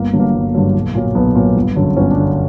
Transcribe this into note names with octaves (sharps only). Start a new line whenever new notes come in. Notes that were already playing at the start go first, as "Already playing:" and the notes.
Already playing: G1 A#3
G2 D3 F#3
A#3
G1
G2 D3 F#3
B1
A#2 F#3
B1 B3
A#2 F#3
G1
F#2 D3 F#3
G1 C#4
D4
F#2 D3 F#3